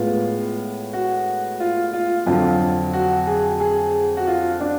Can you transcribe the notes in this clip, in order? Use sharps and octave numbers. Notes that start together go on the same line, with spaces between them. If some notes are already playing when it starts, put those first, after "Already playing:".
Already playing: A2 G#3 B3 F4
F#4
F4
F4
F2 D3 F#3 F4
F#4
G#4
G#4
F#4
F4
D4